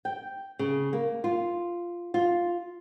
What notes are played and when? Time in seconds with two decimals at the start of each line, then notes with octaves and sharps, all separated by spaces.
0.05 G5
0.59 C#3
0.93 A#3
1.24 F4
2.14 F4